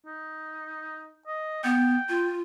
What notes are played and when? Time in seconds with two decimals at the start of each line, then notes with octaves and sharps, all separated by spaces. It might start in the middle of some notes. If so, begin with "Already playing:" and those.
0.06 D#4
1.27 D#5
1.64 B3 G5
2.09 F4